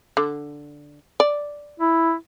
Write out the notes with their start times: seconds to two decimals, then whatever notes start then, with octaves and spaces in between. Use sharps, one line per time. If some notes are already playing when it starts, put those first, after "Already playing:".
0.17 D3
1.20 D5
1.80 E4